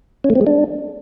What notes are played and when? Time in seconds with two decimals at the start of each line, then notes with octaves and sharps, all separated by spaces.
0.24 C#4
0.30 A3
0.35 C4
0.41 G#3
0.47 D4